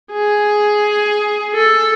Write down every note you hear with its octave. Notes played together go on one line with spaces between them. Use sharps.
G#4
A4